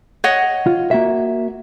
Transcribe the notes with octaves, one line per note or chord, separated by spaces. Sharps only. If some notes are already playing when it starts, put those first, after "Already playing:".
C#5 D#5 F#5
F4
A#3 F#4 E5